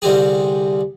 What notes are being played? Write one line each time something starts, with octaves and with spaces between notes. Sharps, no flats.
C2 D3 C4 G4 G#4